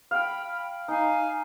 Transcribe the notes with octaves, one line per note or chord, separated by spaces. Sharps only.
F5 G5 B5
D#4 F5 G#5